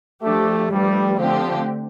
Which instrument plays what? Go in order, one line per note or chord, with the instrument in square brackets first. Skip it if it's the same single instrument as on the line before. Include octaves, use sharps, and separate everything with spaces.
[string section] F3 D4 G4 [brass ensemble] A3
[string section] G2 F3 A3 [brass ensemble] G3
[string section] D3 A3 C4 G4 [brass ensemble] F3